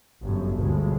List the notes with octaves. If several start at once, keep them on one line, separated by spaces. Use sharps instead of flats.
G1 F#2
G1 D2 G2 B2 G#3